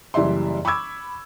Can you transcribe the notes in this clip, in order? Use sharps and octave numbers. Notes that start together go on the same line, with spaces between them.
F#1 E3 G3 D5 E5 C6
B5 C#6 D6 E6 G#6